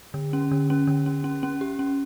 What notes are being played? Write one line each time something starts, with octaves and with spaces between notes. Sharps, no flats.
D3
C#4
D3
C#4
D3
C#4
C#4
C#4
G4
C#4